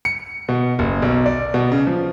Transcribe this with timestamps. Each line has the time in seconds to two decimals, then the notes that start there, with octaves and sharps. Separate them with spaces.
0.05 C#7
0.49 B2
0.79 F#1
1.02 B1
1.26 D5
1.54 B2
1.72 C#3
1.87 F3